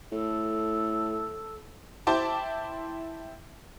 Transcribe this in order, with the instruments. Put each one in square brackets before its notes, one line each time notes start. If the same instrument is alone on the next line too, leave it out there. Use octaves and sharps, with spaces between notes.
[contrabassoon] A2 [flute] A4
[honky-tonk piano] E4 C5 G5 A5 D6